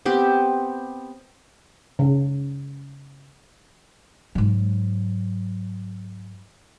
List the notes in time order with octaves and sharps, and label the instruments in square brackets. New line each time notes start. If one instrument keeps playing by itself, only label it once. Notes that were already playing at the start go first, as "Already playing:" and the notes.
[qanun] B3 C4 G4
[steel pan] C#3
[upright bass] G#2 F#3